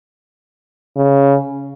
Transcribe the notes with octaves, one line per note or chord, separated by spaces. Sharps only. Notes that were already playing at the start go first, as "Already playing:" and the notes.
C#3